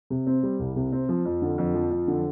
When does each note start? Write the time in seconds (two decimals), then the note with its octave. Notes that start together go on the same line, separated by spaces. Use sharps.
0.10 C3
0.27 C4
0.43 G3
0.59 C2
0.76 C3
0.92 C4
1.09 F3
1.25 F2
1.42 D3
1.58 F2
1.74 F3
1.91 F2
2.08 D3